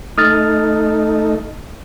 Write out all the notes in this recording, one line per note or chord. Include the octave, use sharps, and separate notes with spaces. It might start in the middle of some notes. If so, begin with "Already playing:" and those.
A3 D#4 D#6 F6 A6